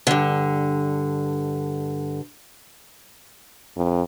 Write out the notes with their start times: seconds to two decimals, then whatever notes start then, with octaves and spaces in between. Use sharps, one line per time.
0.07 G2 D3
3.77 F2